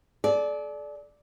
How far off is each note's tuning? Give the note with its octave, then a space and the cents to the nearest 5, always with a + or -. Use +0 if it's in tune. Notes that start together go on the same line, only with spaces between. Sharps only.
A4 -45 D5 +0